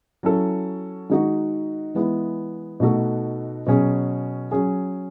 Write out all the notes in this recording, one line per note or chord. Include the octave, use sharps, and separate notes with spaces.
F#3 C#4 E4 A4
D#3 G#3 D#4 F#4
E3 G#3 B3 E4 G#4
B2 A3 D#4 F#4 A4
B2 F#3 C#4 G#4
F#3 C#4 G#4